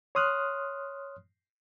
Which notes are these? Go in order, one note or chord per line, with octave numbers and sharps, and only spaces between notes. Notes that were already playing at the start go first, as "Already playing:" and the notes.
C#5 C6 D#6 F6 F#6